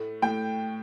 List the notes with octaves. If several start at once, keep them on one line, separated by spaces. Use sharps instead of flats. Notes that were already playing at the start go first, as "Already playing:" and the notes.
Already playing: A2 A3
A2 A3 G5